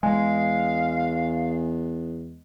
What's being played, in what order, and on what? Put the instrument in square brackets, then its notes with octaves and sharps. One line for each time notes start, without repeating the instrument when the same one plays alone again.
[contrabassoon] E2 [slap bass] G#3 [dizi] F5 [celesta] G#5